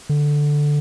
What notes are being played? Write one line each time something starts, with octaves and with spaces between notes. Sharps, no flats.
D3